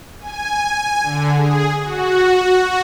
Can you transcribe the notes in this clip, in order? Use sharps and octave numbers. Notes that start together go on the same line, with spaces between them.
G#5
D3
G#4
F#4